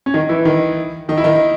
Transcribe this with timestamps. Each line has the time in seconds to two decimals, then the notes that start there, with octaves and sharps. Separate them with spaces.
0.06 C#4
0.14 D#3 D#4
0.29 E3 E4
0.45 D#3 D#4
1.09 D#3 D#4
1.18 E4
1.24 D#3 D#4